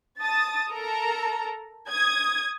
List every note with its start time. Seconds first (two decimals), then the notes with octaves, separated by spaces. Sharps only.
0.21 A5 D#6 A6
0.70 A4 A#4 A#5
1.90 D#6 G#6